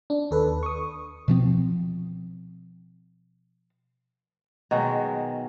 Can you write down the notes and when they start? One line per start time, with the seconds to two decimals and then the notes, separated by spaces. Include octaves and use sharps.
0.10 D4
0.31 D#2 A4 B4
0.63 C#6 D#6
1.28 B2 F3 C4
4.71 B2 D#3 F#3 G#3